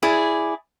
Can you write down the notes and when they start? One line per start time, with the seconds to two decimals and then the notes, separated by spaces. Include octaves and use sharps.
0.02 E4 G#4 D5